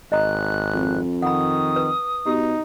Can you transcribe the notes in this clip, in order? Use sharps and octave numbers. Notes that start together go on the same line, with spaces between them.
G#1 D#5 A#5 D#6 F#6
F2
D#3 F#5 B5 D#6
B4
B2 D#4 G4